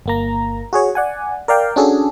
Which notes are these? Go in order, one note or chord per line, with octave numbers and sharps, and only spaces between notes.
G1 A#3 A#5
F#4 G#4 C#5
D5 F#5 G#5
A#4 D5 F5 G5
C#4 D4 F#4 G#4 A4